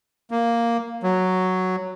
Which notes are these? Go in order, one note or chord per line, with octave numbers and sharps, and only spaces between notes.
A#3
F#3